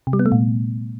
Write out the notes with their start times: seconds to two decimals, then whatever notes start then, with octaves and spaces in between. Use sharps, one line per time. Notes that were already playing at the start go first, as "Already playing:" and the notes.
0.07 C3
0.13 G3
0.19 B3
0.26 A3
0.32 A#2